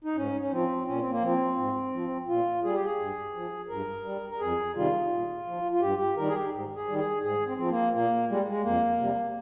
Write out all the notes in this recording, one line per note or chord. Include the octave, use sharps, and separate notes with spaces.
D#4
G#2 C#4
C#4
F3 C4
A#2 C#4
C4
A#3
F3 C4
G#2
F3
A#2 F4
G3 G#4
G4
G#4
G2
F3
G2 A#4
G3
A#4
F2 G#4
C3 D#3 G3 F4
A#2
F3
F4
G2 G4
G4
D#3 G3 A#4
G#4
G4
G#2
G#4
D#3 G3
G#4
G#2 G#4
C4
F3 C4
A#3
A#2 A#3
G3 G#3
G#3
F2 A#3
C3 G3